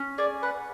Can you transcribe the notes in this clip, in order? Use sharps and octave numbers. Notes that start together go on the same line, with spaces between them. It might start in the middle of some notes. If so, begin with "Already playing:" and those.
Already playing: C#4
G#4 D5
B4 F#5